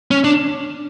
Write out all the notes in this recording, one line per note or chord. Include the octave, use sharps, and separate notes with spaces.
C#4
D4